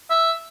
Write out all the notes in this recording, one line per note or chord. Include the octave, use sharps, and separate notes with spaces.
E5